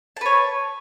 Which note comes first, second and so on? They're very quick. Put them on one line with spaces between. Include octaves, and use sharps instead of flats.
A5 B4 C#5